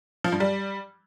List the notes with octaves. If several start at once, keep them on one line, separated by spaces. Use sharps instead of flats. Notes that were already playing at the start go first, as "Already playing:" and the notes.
F3
G2
G3